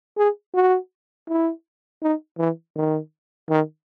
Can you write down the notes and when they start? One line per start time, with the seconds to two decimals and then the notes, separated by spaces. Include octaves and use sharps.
0.17 G#4
0.54 F#4
1.28 E4
2.02 D#4
2.38 E3
2.76 D#3
3.49 D#3